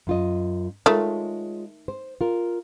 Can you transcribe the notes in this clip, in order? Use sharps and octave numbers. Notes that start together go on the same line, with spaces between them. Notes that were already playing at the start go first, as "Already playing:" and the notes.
F#2 F4 D#5
D#3 G#3 A3 F4 C#5
C5
F4 A#4